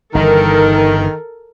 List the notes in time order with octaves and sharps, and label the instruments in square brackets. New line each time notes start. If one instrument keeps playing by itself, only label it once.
[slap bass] G1 G2 E3 [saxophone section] D#3 [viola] A4 A#4